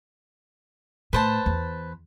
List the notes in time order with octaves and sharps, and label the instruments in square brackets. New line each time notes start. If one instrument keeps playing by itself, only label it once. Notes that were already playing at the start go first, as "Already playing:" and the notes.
[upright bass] A2 [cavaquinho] B4 C5 A5
[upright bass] E2